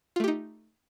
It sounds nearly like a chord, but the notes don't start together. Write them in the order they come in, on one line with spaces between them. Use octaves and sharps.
F4 A3 G4 D#4